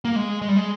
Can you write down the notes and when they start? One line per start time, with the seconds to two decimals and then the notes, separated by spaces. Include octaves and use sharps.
0.05 A#3
0.16 G#3
0.42 G#3
0.48 G3
0.56 G#3